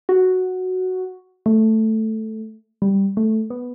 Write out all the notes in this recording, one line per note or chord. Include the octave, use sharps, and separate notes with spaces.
F#4
A3
G3
A3
B3